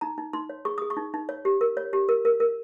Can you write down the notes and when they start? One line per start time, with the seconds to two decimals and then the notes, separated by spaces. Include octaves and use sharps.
0.01 D#4 A#5
0.18 D#4
0.33 D#4 C6
0.50 C#5
0.65 G#4 C#6
0.78 G#4 D#6
0.90 C#6
0.97 D#4
1.14 D#4
1.29 C#5
1.45 G4
1.61 A#4
1.77 C#5
1.93 G4
2.09 A#4
2.25 A#4
2.40 A#4